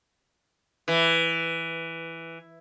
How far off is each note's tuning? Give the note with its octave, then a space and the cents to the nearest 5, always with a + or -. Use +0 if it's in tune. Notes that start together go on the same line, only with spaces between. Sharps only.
E3 +5